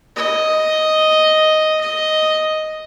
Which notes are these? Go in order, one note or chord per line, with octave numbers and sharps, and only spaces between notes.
D#5
D#5